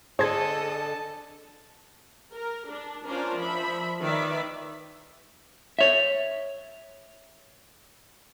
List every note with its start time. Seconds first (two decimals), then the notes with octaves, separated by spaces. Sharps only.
0.19 D3 G#4 A4 C5 D#5 A5 G#6
2.35 A#4
2.69 D4
3.07 C#4 D4 F4 A#4 C5 D5
3.37 F3 E5 B5
4.01 D#3 B4 D5 E5
5.79 C#5 E5